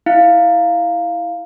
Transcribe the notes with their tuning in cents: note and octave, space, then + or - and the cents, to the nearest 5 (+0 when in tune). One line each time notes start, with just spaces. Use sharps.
E4 -10 F5 +0